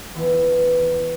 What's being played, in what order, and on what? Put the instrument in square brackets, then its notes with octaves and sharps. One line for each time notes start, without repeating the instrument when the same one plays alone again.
[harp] E3 B3 E4